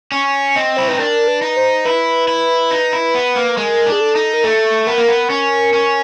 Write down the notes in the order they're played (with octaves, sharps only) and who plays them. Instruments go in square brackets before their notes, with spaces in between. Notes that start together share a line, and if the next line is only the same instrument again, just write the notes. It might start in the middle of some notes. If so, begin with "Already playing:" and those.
[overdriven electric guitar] C#4
[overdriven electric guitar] C4 [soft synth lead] D#5
[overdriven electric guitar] E4 [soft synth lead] C5
[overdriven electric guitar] D#4 [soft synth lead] B4
[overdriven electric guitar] D4 [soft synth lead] A#4
[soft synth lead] B4
[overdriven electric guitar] D#4
[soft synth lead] C5
[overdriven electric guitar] E4 [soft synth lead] B4
[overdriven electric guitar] E4
D#4
E4
B3
A#3
[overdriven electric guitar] G#3 [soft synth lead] A#4
[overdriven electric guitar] D4
[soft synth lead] G#4
A4
[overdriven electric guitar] D#4
[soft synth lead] A#4
[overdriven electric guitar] A3 [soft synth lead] A4
[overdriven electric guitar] B3 [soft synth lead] A#4
[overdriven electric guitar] A#3
B3
C#4
C#4